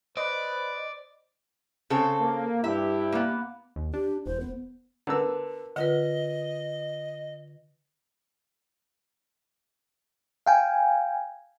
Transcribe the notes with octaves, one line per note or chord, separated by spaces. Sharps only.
B4 C5 D5 D#5
C#3 C4 A4
A#3
G2 E4 G4 E5
A#3 B3
D#2
D4 G4
E1 C5
B3
D3 B3 A#4 A#5 E6
D3 F4 B4 D#5 F#5
F5 G5 G#5